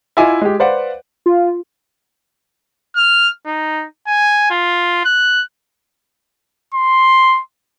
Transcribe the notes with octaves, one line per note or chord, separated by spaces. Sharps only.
E4 F4 D#5 E5 G#5 D6
G#3 G4
B4 C5 D5 F5 F#5
F4
F6
D#4
G#5
F4
F#6
C6